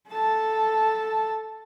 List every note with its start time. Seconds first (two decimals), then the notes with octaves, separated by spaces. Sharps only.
0.10 A4 A5